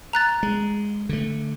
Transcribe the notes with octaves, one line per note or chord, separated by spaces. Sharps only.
A#5 F#6 A6
G#3
D3 A3